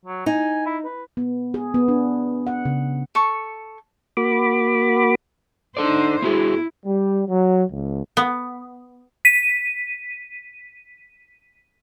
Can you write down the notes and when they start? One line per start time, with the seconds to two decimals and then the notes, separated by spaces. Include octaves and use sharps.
0.05 F#3
0.26 D#4 G#5
0.66 E4
0.84 B4
1.17 B3
1.54 G#4
1.74 B3
1.88 D4
2.47 F#5
2.65 C#3
3.15 A4 C#6
4.17 A#3 F#4 B5 D6
5.77 D4 D#4 A4 C5 D5
6.22 B3 E4 F#4 G#4
6.86 G3
7.28 F#3
7.70 C#2
8.17 B3
9.25 B6 D#7